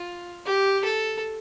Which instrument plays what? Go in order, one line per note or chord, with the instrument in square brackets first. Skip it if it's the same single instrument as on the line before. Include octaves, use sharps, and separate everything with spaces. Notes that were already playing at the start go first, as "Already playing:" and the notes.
Already playing: [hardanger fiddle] F4
G4
A4